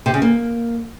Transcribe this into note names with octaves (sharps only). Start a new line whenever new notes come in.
C3
C#3
A#3